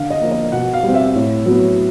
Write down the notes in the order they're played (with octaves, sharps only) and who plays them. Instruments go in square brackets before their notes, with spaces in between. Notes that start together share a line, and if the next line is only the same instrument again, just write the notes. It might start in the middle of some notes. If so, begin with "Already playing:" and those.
Already playing: [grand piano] D3 F5
D#5
F3 A#3
D#5
B2 F#5
F5
G3 C4
E5
A2
F#3 B3